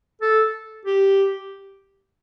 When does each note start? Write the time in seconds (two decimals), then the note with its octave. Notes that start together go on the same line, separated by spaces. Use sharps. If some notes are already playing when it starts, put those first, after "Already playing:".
0.21 A4
0.86 G4